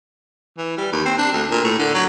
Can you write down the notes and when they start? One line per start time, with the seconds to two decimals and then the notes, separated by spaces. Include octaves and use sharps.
0.58 E3
0.78 G3
0.92 D#2
1.05 C4
1.18 D4
1.33 D2
1.51 A#2
1.64 A2
1.79 D3
1.94 F#3